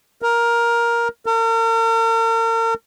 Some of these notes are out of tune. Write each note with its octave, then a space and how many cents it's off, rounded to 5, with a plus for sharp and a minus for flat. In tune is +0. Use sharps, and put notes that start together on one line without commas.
A#4 +10
A#4 -40